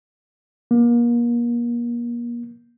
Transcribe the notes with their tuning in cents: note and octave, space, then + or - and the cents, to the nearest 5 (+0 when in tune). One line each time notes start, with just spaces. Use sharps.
A#3 +35